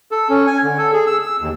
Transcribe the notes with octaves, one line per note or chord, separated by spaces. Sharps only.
A4
C#4
G#5
D3
A4
G#4
E6
E6
D#2